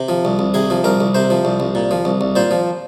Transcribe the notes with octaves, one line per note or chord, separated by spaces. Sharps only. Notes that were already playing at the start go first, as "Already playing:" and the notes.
Already playing: C3
F3
C2
C2
C3 G#4
F3
C2 A#4
C2
C3 C5
F3
C2
C2
A#2
F3
C2
C2
A#2 C5
F3